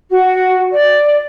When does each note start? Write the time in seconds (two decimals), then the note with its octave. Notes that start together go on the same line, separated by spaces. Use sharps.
0.09 F#4
0.70 D5